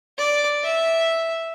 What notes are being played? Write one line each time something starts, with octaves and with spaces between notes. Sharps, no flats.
D5
E5